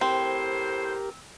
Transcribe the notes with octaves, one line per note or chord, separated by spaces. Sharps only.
A2 C4 G4 A#4 C5